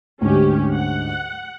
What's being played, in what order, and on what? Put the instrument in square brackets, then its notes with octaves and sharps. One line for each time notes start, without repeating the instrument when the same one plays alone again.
[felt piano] D2 G#2 D3 [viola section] C#4 G4
[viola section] F#5